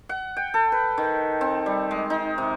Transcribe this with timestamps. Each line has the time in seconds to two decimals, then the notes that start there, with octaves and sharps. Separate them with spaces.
0.09 F#5
0.37 G5
0.54 A4
0.72 B4
0.98 D#3
1.41 C4
1.66 G3
1.91 G#3
2.10 D#4
2.38 C3